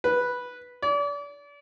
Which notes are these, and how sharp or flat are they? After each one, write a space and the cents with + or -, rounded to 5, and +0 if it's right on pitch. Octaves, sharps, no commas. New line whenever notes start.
B4 -5
D5 -35